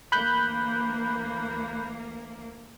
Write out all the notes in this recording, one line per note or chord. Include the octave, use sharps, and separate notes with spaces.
D2 E3 A#3 B5 F#6 G6